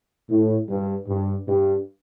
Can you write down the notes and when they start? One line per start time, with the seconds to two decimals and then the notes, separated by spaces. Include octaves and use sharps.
0.29 A2
0.69 G2
1.08 G2
1.48 G2